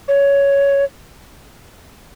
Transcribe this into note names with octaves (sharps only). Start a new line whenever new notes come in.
C#5